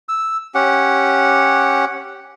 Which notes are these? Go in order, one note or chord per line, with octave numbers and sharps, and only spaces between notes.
E6
C#4 G4 F#5